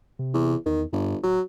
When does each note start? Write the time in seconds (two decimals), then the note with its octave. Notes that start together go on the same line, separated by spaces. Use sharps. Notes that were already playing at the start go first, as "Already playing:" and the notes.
0.19 C3
0.34 E2
0.66 E2 D#3
0.93 G1 G2
1.23 D1 F#3